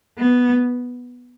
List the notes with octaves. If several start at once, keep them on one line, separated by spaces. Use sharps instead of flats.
B3